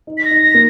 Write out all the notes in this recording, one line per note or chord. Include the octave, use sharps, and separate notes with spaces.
D#4
B6
A#6
D#4
A#6
A#3